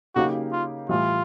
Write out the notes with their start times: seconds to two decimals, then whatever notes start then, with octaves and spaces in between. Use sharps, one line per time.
0.15 C#3 F#3 A#3 D#4 F#4 G4
0.52 F4
0.89 A2 E3 G3 F4